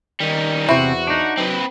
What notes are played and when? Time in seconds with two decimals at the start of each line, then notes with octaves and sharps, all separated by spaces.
0.20 D#3 G3 D#4
0.69 E2 C3 C4 E4 F#4 C5
1.07 D4 D#4
1.38 F#3 C4 B4